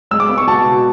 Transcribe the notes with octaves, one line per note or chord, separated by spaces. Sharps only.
G#3 E6
D6
B3
C#6
F#4 A5
B2